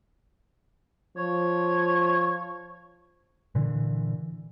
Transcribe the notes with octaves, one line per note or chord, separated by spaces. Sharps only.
F3 C#5
A#2 D3 E3